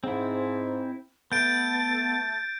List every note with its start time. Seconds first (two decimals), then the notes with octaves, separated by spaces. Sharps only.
0.04 G#2 C4 E4
1.32 A3 B3 A4 G6 A6 D7